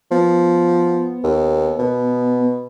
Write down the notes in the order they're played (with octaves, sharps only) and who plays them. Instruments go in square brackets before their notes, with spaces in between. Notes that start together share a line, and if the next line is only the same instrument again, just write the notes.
[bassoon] F3 [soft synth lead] B3
[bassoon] D#2
B2